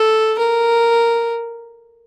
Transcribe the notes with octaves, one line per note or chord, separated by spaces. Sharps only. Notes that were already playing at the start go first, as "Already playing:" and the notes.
Already playing: A4
A#4